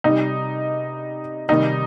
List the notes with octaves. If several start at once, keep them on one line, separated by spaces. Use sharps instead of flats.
C3 G3 D#4
C3 D#3 G3 D#4